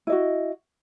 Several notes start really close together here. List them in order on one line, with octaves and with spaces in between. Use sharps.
E4 D#5 F#4